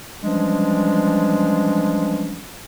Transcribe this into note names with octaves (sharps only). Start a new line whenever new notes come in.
E3 F3 G3 G#3 C#4 D4